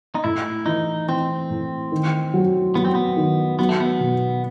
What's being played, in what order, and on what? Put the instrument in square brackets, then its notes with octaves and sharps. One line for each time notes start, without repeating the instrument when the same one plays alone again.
[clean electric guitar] D#4
[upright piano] A2 [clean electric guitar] E4
[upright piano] E3 [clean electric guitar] D#4
[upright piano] E3 [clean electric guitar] C4
[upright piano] A2
D#3
F#3
[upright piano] F#3 [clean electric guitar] B3
[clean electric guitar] C4
B3
[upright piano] D#3
[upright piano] F#3 [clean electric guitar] B3
[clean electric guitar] A3
B3
[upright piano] B2